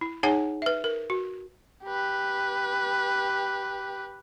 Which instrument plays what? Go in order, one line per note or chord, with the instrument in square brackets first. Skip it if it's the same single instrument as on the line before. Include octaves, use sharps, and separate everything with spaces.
[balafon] E4
D#4 G#4 C#5 F#5 G#5
B4 E5
A#4
F#4
[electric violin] G4 B4